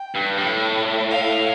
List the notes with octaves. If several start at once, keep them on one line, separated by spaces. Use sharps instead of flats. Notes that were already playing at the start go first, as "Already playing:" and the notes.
Already playing: G5
G2
A2
F5